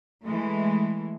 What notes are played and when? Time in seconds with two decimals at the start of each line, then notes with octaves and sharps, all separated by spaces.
0.25 E3 G#3 A3